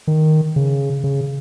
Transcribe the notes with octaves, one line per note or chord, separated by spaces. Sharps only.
D#3
C#3
C#3